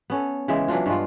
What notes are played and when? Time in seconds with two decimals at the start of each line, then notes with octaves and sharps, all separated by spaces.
0.10 B3 C#4 A4
0.48 C#3 E3 G#3 E5
0.68 E3 F#3 D4 F4
0.86 G2 G#3 B3 F4